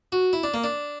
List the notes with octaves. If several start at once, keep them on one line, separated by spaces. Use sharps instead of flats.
F#4
E4
D4
A#3
D4